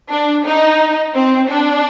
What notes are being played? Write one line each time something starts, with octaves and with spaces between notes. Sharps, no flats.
D4
D#4
C4
D4